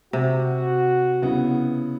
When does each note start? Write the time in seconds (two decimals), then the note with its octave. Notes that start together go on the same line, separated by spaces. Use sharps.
0.13 C3 F#4
1.22 C#3 B3 E4